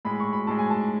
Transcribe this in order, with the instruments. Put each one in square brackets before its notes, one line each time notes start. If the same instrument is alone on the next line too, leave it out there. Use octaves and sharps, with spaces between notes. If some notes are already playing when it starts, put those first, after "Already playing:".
[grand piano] A2 G#3 B5
C#6
B5
A2 G#3 A5
G#5
A5